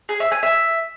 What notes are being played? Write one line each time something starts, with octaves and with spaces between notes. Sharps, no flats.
G#4
E5
G#5
E5